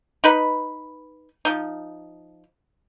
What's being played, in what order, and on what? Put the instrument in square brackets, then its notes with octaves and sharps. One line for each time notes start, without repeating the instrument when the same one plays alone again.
[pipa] D#4 B4 B5
F3 D#4